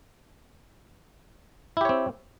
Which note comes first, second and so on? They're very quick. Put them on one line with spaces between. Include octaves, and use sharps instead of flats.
E4 G4 C#5 C4